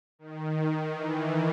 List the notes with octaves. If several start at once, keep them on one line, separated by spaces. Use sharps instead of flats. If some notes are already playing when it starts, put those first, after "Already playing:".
D#3
E3